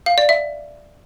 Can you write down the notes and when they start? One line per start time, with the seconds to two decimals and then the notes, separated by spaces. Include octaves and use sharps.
0.06 F5
0.18 D5
0.29 E5